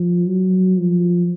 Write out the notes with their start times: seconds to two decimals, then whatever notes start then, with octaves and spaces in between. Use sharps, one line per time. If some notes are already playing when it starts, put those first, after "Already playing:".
Already playing: F3
0.26 F#3
0.77 F3